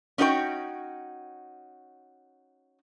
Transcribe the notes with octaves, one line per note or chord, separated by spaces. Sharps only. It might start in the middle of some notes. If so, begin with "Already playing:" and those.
C#4 D#4 F#4 C5 G5